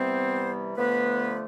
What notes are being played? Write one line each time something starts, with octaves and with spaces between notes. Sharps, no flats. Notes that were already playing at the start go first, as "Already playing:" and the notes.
Already playing: C3 E3 G3 B3 C4 C5
D3 F3 A3 B3 B4